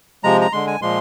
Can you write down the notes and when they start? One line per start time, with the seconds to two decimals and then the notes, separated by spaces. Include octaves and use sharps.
0.24 C3 F3 G#3 A#5
0.41 A#5
0.53 D3 G#3 C6
0.67 G#5
0.82 A#2 F3 G#3 C6